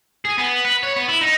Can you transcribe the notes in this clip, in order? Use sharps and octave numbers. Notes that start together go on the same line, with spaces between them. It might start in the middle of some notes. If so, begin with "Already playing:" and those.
G#4
B3
B4
C#5
B3
E4
D#4